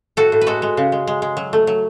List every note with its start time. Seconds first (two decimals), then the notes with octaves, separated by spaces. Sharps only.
0.17 A2 F#4 A4
0.32 A2
0.41 B4
0.46 G#3 F#4 A4
0.62 G#3
0.77 C#3
0.92 G#3
1.07 G#3
1.22 G#3
1.37 F#3
1.53 A3
1.67 F#3